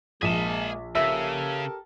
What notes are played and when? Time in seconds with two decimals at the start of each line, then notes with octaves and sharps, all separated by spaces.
0.22 A#1 G#3 A#3 G#4 A5 B6
0.95 C#3 G4 A4 A#4 E5